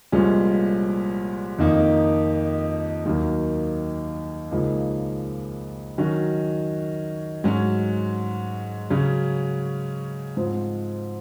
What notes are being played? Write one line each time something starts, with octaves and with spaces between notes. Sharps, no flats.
C2 A#2 F3 G#3 C#4
F2 D#3 A#3 D#4
D#2 D#3 F#3 A#3
C#2 C#3 F3 A#3 D#4
D#3 F#3 C#4 F#4
G#2 F#3 C#4
C#3 F#3 C#4
G#2 F3 C4